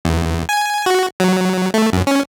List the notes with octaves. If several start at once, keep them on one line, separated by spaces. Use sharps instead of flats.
E2
G#5
F#4
F#3
A3
F#2
C#4